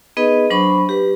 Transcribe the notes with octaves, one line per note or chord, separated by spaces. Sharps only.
B3 D#4 G#4 B4 D#5
F#3 D4 C5 B5 C#6
G4 B4